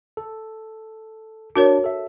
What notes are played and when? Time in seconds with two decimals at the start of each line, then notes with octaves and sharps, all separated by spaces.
0.17 A4
1.56 D4 F#4 A#4 C#5 A5
1.84 A4 E5